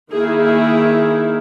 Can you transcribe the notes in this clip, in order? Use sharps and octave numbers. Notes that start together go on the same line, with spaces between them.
D#3 A#3 E4 G#4
G#4